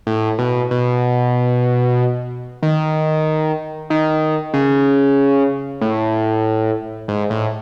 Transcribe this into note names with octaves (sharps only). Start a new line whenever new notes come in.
A2
B2
B2
D#3
D#3
C#3
A2
G#2
A2